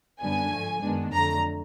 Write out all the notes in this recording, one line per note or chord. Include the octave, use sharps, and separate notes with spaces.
F#2 D3 G3 B3 D4 G#5
G#2 F3 A3
F#2 D#3 G#3 B3 D4
F2 D3 F#3 A3 A#5